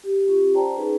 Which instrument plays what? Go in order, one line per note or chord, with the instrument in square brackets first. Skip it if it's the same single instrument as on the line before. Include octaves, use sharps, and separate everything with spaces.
[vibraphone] G4
C#4 F4 G4
C5 D5 G5 A5 A#5
C#4 D#4 G#4 B4